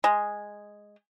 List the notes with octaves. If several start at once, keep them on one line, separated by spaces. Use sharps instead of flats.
G#3